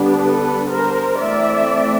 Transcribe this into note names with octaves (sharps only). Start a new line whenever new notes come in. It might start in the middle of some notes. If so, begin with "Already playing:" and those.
Already playing: D3 G3 B3 D4
A4 B4
A#4 C5
E3 A3 C4 D5 E5